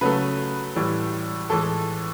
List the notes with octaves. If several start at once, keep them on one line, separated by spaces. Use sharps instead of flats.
C#3 F#3 A3 B4
A2 E3 G3
A2 E3 G#3 A4